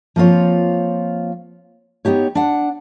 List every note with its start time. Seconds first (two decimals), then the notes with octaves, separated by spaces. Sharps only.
0.16 F3 A#3 C4 F4 C#5
2.05 B3 D#4 G4 C#5
2.35 D4 F#5